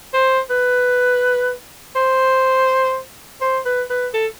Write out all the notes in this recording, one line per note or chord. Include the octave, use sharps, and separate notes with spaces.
C5
B4
C5
C5
B4
B4
A4